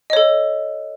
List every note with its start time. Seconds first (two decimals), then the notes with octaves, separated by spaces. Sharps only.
0.10 D#5
0.13 C#5
0.17 A4